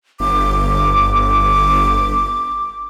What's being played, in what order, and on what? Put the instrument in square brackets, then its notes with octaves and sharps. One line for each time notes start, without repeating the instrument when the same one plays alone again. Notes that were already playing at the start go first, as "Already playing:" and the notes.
[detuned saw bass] G1 [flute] D6